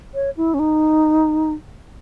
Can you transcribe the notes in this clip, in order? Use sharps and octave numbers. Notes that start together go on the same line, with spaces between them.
C#5
E4
C#4
D#4